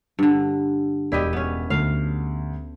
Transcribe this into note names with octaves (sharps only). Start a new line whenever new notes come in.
G2 D3
E1 E4 G4 D5 D#5 B6
B3 C#4
D2 F5